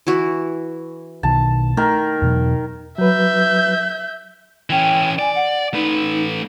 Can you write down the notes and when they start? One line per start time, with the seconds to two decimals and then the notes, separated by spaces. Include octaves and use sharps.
0.07 E3 E4 F#4
1.23 B1 B2 D#3 A5
1.77 D#3 A3 A#4
2.22 E2 B2 F#3
2.98 F#3 B4 E5 G6
4.70 E3 C#4 G5
5.19 D5 G#5
5.35 F#5
5.74 A3 D#4 B4